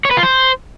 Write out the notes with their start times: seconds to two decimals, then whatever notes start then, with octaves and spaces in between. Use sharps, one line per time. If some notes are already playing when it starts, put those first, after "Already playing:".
0.05 C#5
0.11 B4
0.17 F4
0.23 C5